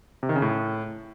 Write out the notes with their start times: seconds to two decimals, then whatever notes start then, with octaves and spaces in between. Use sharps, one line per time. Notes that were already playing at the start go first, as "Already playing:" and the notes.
0.23 C3
0.29 D#3
0.36 C#3
0.42 A2